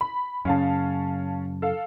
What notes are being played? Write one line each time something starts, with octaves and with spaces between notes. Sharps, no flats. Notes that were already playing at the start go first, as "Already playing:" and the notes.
B5
F#2 C#3 C#4 F5 A5
A4 F5